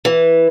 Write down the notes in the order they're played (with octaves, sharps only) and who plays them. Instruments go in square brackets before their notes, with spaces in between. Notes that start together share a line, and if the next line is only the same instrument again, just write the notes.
[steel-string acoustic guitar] E3